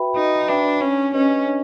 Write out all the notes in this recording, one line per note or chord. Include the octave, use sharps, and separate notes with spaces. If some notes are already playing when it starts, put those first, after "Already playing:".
Already playing: F#4 B4 E5 G5 B5
D#4 F#4
D4 B4 E5 G5 B5
C#4 D4
C#4 G4 B4 D#5
D4